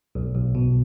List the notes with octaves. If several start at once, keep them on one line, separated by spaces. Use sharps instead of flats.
B1
B1
B2